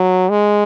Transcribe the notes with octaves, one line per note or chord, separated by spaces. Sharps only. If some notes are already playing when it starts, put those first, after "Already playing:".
Already playing: F#3
G#3